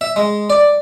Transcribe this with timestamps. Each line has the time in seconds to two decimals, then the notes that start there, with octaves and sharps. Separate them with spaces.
0.01 E5
0.16 G#3
0.50 D5